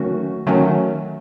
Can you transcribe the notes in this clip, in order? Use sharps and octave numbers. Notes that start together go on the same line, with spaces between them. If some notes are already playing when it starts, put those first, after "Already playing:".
Already playing: D#3 F#3 A3 C#4 F#4
D#3 F#3 A3 C#4 F#4